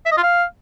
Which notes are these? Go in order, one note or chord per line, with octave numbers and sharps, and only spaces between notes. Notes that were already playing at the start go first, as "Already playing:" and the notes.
E5
D#5
F4
F5